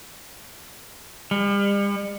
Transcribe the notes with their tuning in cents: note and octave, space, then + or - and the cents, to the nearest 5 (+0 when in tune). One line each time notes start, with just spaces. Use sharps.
G3 +40